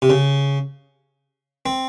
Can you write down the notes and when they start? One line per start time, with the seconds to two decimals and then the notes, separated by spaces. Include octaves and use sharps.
0.02 C3
0.10 C#3
1.66 C4